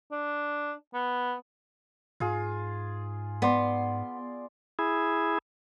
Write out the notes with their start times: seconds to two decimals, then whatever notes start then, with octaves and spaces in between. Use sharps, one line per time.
0.12 D4
0.94 B3
2.20 G#2 F4 G#4
3.42 B3 D5 C6
4.79 E4 G#4